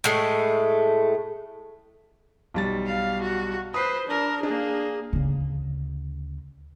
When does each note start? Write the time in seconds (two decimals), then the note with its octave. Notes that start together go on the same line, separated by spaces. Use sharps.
0.04 A2 G#3 A3
2.54 B1 G3 A6
2.86 F5
3.22 F#4
3.74 B4 C5 D#6 C7
4.08 D4 A#4
4.43 A#3 D4 G#4
5.13 D2 C#3